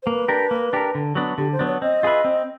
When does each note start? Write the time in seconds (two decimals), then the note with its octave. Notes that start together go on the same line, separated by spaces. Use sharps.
0.03 C5
0.07 A#3 B4
0.28 D4 G4 A#4
0.51 A#3
0.73 D4 G4 A#4
0.95 D3
1.15 F#3 B3 D4
1.38 D3 G4
1.52 C5
1.59 F#3 B3 D4
1.67 C#5
1.81 C4 D#5
2.03 F4 G#4 B4 E5
2.25 C4